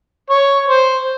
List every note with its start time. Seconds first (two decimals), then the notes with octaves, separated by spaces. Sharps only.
0.30 C#5
0.68 C5